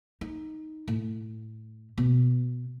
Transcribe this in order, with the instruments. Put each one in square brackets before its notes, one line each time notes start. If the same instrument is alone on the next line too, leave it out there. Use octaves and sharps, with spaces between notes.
[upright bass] D#4
A2
B2